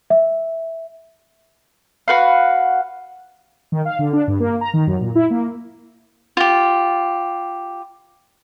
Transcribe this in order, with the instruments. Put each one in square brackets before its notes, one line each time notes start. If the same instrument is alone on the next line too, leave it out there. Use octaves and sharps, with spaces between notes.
[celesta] E5
[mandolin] F#4 B4 F5
[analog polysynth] D#3
F5
D3
D4
G2
A#3
A#5
D#3
F#2
A#2
E4
A#3
[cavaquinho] F4 G4